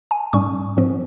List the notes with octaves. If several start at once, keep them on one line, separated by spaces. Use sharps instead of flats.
G#5
G#2 G3 C#4 C#6
G#2 F3 C4